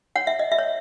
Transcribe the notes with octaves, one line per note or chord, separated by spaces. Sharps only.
C#5 F#5
E5
D#5
E5
C#5